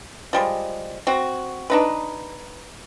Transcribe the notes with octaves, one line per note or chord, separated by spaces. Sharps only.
F3 G3 G#3
C4 F#4
D4 D#4 B4